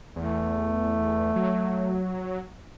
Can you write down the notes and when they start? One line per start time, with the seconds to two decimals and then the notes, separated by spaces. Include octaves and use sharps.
0.16 E2 A3
1.36 F#3